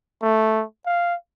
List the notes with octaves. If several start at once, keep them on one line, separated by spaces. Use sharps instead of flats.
A3
F5